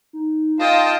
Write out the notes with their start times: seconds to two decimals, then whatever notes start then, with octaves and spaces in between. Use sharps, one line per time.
0.13 D#4
0.60 F4 D#5 F5 G5 A5 A#6